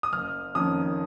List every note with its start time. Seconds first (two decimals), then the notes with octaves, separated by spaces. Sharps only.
0.03 D#6
0.12 F#1 F6
0.55 F2 D#3 A#3 C#4 D#6